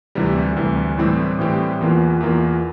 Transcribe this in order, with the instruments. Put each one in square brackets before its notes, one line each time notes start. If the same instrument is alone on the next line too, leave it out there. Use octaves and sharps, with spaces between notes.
[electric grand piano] D2 C3 E3 G3
D2 C3 E3 G3
A2 E3 G3 C4 G4
A2 E3 G3 C4 G4
E2 E3 A#3 F4
E2 E3 A#3 F4